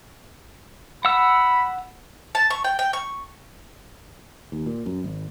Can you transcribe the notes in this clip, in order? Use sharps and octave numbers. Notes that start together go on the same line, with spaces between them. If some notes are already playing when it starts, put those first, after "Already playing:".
F#5 B5 E6
A5
C#6
G5
G5
C#6
D#2
A#2
F#2
G#1